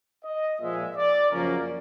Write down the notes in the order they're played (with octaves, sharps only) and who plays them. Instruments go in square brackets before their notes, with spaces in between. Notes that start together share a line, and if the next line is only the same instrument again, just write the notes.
[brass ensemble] D#5
A#2 F3 G#3 E5
D5
F#2 C#3 F3 A#3 C#4 A#4